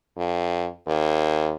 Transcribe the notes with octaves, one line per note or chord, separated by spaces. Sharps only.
F2
D#2